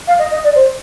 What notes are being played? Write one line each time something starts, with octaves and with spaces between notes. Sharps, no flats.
F5
D#5
D#5
D5
C5